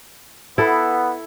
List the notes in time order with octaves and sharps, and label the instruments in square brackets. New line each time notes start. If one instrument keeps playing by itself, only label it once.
[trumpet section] B3 [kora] E4 A4